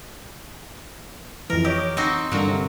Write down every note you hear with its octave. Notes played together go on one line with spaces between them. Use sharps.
F2 E3 A#4
G4 C#5 D#5
C4 D#4 F#4
G2 D3 F#3 A#3 F#4
C3